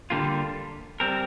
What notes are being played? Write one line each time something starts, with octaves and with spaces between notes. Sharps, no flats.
D3 G3 A#3 F4
G3 C4 A#4